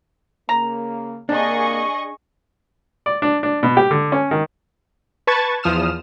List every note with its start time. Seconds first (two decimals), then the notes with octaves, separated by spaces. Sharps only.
0.49 C#3 A#3 A#5
1.29 C3 A#3 D4 G#4 D#5 C#6
3.06 D5
3.22 D4
3.43 D4
3.63 B2
3.77 G4
3.91 D3
4.12 C#4
4.31 D#3
5.27 B4 A5 C#6 G#6 A6
5.63 E2 F3 D#6 F6 E7